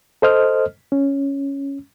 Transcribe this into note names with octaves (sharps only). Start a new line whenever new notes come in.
A4 C5 D#5 F6
C#4